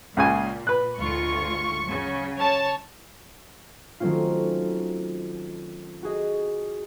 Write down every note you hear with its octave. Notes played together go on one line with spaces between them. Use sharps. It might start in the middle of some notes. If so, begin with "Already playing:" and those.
C#2 A#2 C#3 G#5
B4 F#6
D2 G#2 F4 C#6
C#3 F#3
C#5 A5
D#3 F#3 A3 C4 C#4 F4
F#4 G#4 D#5